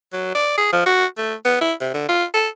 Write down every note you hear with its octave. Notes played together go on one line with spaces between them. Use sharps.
F#3
D5
G#4
F3
F#4
A3
B3
E4
C3
D3
F4
A4